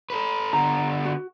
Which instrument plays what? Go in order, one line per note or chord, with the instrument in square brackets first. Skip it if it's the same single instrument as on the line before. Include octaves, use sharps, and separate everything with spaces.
[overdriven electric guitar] A4 B4
[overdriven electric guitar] D3 B3 [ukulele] A#5
[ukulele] F#4